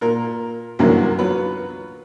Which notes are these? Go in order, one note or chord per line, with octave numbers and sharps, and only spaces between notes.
A#2 A#4
C2 F#2 D3 E3 F#3 A#3
F#3 B3 F4 B4